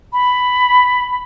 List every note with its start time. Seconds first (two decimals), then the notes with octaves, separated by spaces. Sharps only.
0.13 B5